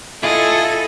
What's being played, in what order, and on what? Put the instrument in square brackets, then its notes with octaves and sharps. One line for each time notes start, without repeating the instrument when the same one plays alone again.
[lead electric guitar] E4 F4 [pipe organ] G#4 [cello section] A4 [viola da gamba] D#5